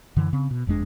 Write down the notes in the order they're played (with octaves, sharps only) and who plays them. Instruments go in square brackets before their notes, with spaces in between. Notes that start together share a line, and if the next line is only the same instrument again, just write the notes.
[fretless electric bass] F#2 D3 E3
C#3 C4
B2
F#1 F2 G#3 D4